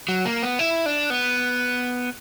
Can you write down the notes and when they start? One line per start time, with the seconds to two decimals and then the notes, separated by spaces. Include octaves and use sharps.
0.08 F#3
0.25 A#3
0.43 B3
0.59 E4
0.86 D4
1.10 B3